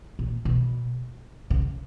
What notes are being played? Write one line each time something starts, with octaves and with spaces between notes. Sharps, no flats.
A#2
B2
C#3